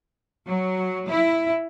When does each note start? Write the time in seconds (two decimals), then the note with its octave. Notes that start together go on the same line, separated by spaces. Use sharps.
0.48 F#3
1.10 E4